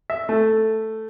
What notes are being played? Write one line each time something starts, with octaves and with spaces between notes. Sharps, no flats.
E5
A3